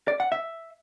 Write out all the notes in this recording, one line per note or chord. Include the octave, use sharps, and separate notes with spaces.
D5
F#5
E5